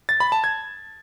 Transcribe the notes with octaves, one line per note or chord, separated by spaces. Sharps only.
A6
B5
A5
G#6